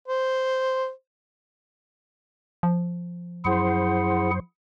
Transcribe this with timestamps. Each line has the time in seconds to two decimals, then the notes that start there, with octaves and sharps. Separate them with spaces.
0.08 C5
2.63 F3
3.45 F#2 E4 G#4 C5 F#5